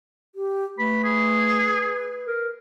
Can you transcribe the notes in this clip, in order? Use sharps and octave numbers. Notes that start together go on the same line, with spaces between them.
G4
A3 B4 B5
G#4
A#4